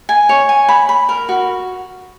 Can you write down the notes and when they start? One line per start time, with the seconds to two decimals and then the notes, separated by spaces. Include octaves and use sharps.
0.09 G#5
0.29 C#5
0.49 G#5
0.69 B5
0.89 B5
1.09 A#4
1.29 F#4